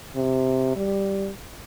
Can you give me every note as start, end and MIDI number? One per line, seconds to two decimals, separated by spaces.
0.16 0.74 48
0.76 1.30 55